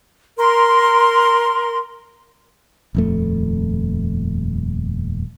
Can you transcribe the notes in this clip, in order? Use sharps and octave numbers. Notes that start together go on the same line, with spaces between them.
A#4 C6
D#1 F2 A3